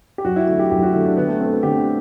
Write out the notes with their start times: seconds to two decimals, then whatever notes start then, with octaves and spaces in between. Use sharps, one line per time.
0.18 G4
0.25 F#2 F#4
0.36 E4
0.48 D3 A3 F#4
0.59 G4
0.71 F#2 G4
0.82 F#4
0.94 D3 A3 E4
1.05 D4
1.17 D3 B3
1.28 A3
1.40 A3 B3 C4
1.52 B3
1.63 D3 G4